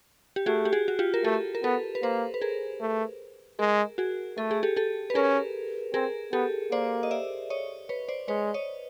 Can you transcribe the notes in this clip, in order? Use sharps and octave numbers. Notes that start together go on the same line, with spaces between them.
G4
A3 F#4 G#4
G4
F#4 G#4
F#4
F4 G4
A#4
A3 G4 A4
A#4
B3 A4 B4
B4
A#3 A#4 C5
B4
G#4 A#4
A3
G#3 G#4 A#4
F#4 G#4
A3 A4
G#4
G4 A4
G4 A4
B4
C#4 G#4 A#4
C4 G#4 A#4
B3 G4 A4
A#3 C5 D5
D#5
D5 E5
C#5 D#5
B4 C#5
C5 D5
G#3 B4 C#5
C#5 D#5